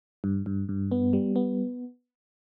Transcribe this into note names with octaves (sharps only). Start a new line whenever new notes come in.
G2
G2
G2
B3
G3
B3